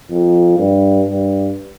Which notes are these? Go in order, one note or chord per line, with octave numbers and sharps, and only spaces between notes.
F2
G2
G2